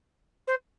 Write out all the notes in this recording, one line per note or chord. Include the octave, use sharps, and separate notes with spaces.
C5